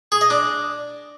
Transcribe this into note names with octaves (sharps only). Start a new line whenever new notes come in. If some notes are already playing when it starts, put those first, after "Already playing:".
G#4
D#5
D4